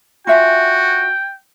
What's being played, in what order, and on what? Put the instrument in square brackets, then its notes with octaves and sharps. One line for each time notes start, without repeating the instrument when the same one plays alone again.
[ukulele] F4 E5 G#5 [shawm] F#4 [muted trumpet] G5